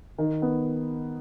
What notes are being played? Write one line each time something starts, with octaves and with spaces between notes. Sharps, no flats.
D#3
B3